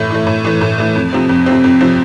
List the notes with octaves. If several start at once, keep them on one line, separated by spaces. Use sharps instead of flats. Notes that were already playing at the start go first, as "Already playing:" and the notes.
Already playing: A2 E3 A3
E3 A3
A2
E3 A3
A2
E3 A3
F2
C3 F3 C4
F2
C3 F3 C4
F2
C3 F3 C4